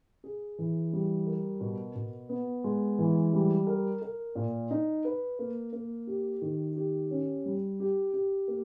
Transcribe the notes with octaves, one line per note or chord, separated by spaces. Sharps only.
G#4
E3
G3
A#4
B2
B2
B3
G#3
E3
G3
A#4
A#4
A#2
D#4
B4
A#3
A#3
G4
D#3
G4
C#4
G3
G4
G4
A#3